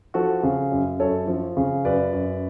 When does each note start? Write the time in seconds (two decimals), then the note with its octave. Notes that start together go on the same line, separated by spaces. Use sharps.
0.14 F3 F#4 A4
0.43 C#3
0.72 F#2
1.00 F#2 A4 C#5
1.28 F3
1.57 C#3
1.85 F#2 B4 D5
2.13 F#2